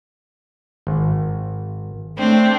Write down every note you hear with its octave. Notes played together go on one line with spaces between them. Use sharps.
G#1
A3 C4 D4